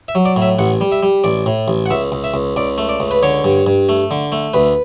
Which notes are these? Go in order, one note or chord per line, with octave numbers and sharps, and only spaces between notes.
E5
F#3
D5
A2
E5
A1 F#5
G3
E5
G3
A1 D5
A2
A1
F#5
C#2 E5
C#2
E5
C#2
C#2 D5
A3
D5
C#2
B4
D3 C#5
G2
G2
A3
D3
A3
D2 B4